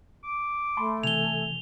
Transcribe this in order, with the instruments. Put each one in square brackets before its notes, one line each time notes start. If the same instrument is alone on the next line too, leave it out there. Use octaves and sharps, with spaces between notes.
[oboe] D6
[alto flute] A3 [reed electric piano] A5 B5 C6
[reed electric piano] C3 E3 [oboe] G#5 [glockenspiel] F7 G7